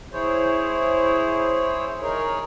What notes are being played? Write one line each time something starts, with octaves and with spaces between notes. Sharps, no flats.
E4 G#4 C5 C#5
D#4 G#4 A#4 C#5